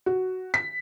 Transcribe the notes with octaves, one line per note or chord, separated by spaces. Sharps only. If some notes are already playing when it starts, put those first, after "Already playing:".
F#4
B6